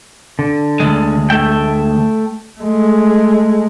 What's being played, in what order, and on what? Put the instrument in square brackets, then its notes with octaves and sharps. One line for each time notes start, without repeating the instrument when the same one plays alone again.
[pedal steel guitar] D3
[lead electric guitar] D2 G#3
[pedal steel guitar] A3 E5 G5
[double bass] G#3 A3